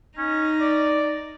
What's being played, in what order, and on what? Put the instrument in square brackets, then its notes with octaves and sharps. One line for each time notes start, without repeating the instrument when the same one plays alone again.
[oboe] C#4 [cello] D#4
[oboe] D5